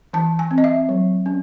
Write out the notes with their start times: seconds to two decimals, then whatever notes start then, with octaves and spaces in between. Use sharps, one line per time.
0.13 E3 A5
0.39 G#5
0.51 C4
0.58 D#5
0.64 E5
0.89 F#3
1.26 C#4